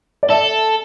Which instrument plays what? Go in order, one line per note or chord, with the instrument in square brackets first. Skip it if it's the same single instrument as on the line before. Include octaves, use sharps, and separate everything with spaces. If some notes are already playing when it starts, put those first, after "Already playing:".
[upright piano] D5
[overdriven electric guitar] A4 [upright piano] E5